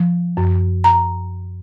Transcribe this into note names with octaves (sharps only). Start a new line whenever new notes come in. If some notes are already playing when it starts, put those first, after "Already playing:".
Already playing: F3
F#2
A#5